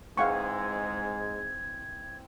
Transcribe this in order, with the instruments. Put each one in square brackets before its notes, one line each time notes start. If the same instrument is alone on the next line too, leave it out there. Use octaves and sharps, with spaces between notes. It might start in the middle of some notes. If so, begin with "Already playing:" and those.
[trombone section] G#2 G#3 [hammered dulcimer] E3 C4 [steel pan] F5 F#5 C#6 [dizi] G#6